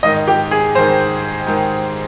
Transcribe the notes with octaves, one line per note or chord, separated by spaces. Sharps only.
G#2 D#3 D#5
G4
G#4
G#2 D#3 C5
G#2 D#3